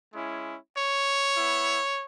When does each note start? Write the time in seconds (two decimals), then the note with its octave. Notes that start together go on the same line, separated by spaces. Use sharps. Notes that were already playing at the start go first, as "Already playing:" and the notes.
0.14 G#3 C#4 E4
0.76 C#5
1.37 B3 E4